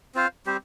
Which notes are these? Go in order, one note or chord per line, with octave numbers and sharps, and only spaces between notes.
C4 F4 C5 F5
G3 C4 G4 C5